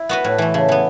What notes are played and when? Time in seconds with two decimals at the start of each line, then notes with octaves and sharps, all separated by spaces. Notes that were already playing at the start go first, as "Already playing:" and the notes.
Already playing: E4
0.09 B3 F#4 B4
0.24 A2
0.38 E3 A3
0.54 C#3
0.69 E3 B3